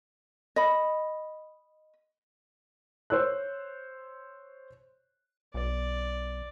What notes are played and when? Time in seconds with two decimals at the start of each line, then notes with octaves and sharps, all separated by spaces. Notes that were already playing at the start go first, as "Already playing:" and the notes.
0.56 D#5 B5
3.10 C5 C#5 E6 F#6
5.54 B1 D5